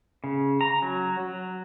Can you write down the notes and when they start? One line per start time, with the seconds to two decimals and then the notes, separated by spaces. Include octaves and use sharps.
0.24 C#3
0.61 A#5
0.82 F#3
1.20 F#3